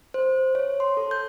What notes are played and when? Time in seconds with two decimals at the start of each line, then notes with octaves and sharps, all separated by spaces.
0.14 C5
0.55 C#5
0.80 C6
0.97 A4
1.11 G6